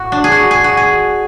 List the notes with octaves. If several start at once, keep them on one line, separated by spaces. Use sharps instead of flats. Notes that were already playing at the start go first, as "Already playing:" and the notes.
Already playing: A2 F#4
D4
G#4
F#4
G#4
F#4
G#4